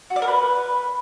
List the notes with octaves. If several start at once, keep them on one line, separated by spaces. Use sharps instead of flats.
F#4
D5
A#4
B4